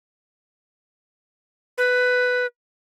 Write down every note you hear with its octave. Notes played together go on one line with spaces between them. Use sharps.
B4